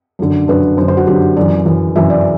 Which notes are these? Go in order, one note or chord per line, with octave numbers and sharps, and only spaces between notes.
F#2 D3
F#2 D3 B4
F#2 D3 C5
C5
F#4
F#2 D3 G4
F#2 E3 D5
F#2 E3
F#2 E3 E5
D5